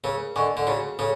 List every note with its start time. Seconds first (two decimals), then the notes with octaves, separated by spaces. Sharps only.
0.04 C#3 A#4
0.36 D3 D#5 G#5 C#6
0.57 D3
0.67 C#3 F#4
0.99 C#3 A4 C#5